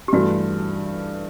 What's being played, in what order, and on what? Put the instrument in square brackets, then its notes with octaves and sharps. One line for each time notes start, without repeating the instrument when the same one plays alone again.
[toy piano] G4
[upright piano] G2 E3 A3 [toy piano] F#4